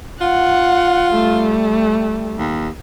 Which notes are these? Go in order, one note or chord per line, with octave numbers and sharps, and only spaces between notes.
F4 F#5
G3 A3
D#2